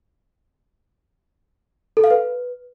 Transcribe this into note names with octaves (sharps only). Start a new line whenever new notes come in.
A4
F5
B4